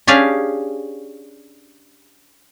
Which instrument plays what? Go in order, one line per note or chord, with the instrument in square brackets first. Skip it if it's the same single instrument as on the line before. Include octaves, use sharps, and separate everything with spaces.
[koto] C#4 D4 G4 G#4 F5